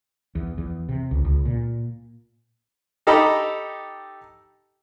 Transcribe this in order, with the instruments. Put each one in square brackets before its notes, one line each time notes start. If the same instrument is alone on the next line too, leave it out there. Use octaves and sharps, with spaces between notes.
[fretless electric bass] E2
E2
C3
C#2
C#2
A#2
[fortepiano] D#4 G4 A4 D#5 A#5 B5